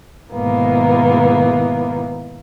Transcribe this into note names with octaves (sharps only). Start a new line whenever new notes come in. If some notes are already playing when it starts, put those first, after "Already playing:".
G#2 B2 D#3 E3 A#3 B3